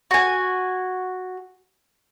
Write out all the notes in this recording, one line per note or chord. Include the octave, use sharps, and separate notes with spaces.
F#4 G#5